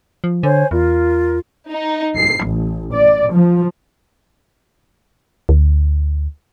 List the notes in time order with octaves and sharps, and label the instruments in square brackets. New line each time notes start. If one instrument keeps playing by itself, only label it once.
[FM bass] F3
[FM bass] D3 [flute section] C5 C#5 G#5
[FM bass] E2 [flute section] F4 A#4
[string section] D#4
C7
A1
D5
F3
[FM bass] D2